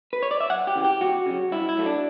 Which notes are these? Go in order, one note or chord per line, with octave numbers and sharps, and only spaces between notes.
B4
C#5
D5
E5
F#2 F#5
G4
C#3 E3
G4
E2 F#4
C#3 F#3
G2 E4
E4
F#3 A3
D4